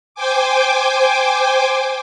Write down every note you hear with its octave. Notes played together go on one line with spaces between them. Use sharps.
C5 G5 G#5 D6